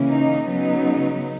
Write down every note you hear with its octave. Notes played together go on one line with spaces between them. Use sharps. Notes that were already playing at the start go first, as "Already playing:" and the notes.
Already playing: C#3 E3 A#3 C#4
D#4
C#3 F#3 B3 D#4